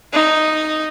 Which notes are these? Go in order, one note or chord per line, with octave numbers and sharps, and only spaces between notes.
D#4